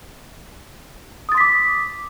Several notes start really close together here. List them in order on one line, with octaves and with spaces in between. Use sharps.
D#6 A6 C6 B6 D6